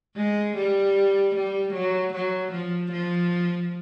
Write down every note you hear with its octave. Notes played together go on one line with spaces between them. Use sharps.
G#3
G3
G3
F#3
F#3
F3
F3